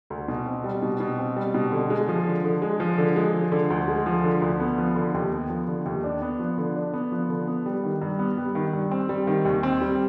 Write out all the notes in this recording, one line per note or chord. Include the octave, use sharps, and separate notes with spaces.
D2
B2
C4
G3
B2
B2
C4
G3
B2
D3
G#3
F3
D3
D3
G#3
F3
D3
G#3
F3
D3
D2
G#3
F3
D3
D2
B3
F3
D3
D#2
B3
F3
D3
D#2
D4
B3
F3
D3
D4
B3
F3
D3
B3
G3
D#3
G2
B3
G3
D#3
G2
C4
G3
D#3
D#2
C4
G3